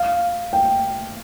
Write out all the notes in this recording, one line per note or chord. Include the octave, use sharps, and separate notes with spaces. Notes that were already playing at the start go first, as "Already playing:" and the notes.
Already playing: F5
G5